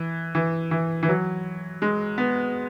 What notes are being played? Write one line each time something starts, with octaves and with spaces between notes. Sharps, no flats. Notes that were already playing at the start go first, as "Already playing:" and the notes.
Already playing: E3
E3
E3
E3
F#3
G#3
B3